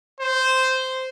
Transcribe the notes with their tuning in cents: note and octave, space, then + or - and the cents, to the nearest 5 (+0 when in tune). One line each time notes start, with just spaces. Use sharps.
C5 -10